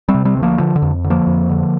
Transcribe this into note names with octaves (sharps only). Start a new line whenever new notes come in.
G3 C4
C3
G3 C4
D2
F3 A#3
D3 F3
D3
F2
D3
F3 A#3
F2
D3